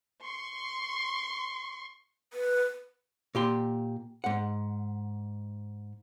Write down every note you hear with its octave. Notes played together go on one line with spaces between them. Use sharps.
C6 C#6
B4
A#2 G4 C6
G#2 F#5